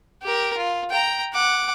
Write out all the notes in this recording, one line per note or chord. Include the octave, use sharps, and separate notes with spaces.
G4 A#4
F4
G5 A#5
F#5 D6